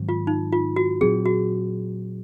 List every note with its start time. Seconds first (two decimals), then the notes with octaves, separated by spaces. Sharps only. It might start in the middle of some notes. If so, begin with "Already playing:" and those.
Already playing: G#2 D#3 F#3 C4
0.09 F4
0.27 D#4
0.52 F4
0.76 F#4
1.01 A#2 F#3 C4 G#4
1.26 F#4